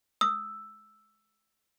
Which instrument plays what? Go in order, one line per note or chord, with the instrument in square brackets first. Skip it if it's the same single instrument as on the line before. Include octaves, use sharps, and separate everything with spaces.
[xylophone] D#6 [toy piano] E6